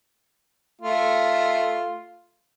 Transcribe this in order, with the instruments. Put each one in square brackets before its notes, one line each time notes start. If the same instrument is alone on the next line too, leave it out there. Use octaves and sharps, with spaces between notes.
[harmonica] A3 F4